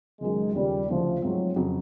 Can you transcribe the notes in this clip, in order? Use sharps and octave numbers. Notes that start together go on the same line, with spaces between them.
F#1 F#2 D#3 F#3 G#3
D#2 C#3 F3 G3
D2 C#3 E3 F3 A3
G#2 F3 F#3 A3 C4
F2 C#3 F#3